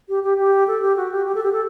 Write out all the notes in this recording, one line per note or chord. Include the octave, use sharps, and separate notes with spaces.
G4
G4
G4
A4
G4
F#4
G4
G4
A4
G4
A4